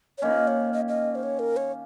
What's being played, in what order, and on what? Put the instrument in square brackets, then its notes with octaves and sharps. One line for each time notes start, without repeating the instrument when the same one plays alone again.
[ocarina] C#5
[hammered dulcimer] D#3 A#3 C#4 [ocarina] D#5
[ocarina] C#5
D#5
D#5
C5
C#5
A#4
C#5